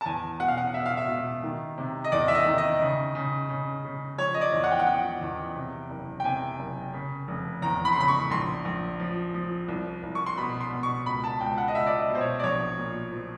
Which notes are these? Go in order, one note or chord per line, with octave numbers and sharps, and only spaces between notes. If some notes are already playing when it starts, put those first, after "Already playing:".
A5
E2 G#5
B2 F#5
F5
F#5
B2 E5
F5
E5
B2
D#3
C3
D#5
E2 D5
E5
D#5
D#3
D#5
C#3
C#3
C#3
C#3
F3 C#5
D#5
D5
E2
F#5
G5
F#5
F3 G5
E2
C3
F#1
G5
C3 G#5
F#1
C#3
F1
E2 A#5
B5
C6
C#3 B5
C#6
A#1 C6
A#1
F3
F3
C2
C2
C#6
C6
B2 B5
C6
B2
C#6
C#2 B5
A5
C#2 G5
F#5
D#5
C#2 E5
D5
D#5
B2
C5
C#5
D5
A#1 C#5
A#2
F3